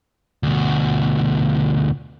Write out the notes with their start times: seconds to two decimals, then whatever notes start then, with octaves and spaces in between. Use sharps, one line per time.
0.43 D2 B2